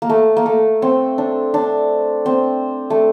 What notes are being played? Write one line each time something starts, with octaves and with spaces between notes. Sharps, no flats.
A#3
A3
A#3
A3
C4
D4
D4
C4
A3